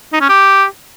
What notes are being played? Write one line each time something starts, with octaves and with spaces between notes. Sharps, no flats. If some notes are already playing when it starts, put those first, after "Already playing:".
D#4
C#4
G4